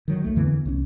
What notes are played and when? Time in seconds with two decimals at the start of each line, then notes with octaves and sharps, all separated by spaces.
0.08 D#3 F#3
0.24 C#2 A3
0.36 F2 D3 E3 B3
0.65 C2 E3 C#4